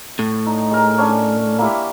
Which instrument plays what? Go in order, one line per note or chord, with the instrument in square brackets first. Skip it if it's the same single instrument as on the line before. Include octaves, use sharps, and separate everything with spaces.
[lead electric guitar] A2
[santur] D#4
G#3 A#4
C#4 D4 G#5
A#3 E4 G4